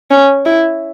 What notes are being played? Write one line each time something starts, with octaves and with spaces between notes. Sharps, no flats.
C#4
E4